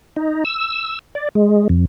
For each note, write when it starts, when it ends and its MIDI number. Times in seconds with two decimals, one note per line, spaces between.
0.16 0.44 63
0.45 0.99 88
1.15 1.29 74
1.35 1.68 56
1.69 1.85 41